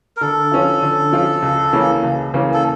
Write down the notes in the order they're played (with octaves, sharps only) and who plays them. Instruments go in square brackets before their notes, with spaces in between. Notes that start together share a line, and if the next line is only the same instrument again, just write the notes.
[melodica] A#4
[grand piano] D3 [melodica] A4
[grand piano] F3 C#4 F4
D3
F3 C#4 F4
C#2
C#3 E3 A#3 C#4
C#2
C#3 E3 A#3 C#4
[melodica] A4